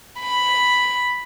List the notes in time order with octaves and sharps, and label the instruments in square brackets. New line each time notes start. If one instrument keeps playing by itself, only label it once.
[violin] B5